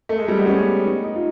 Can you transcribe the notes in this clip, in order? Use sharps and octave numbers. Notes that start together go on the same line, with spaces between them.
A3
G#3
G3
B3
C#4
D#4
D#4
F4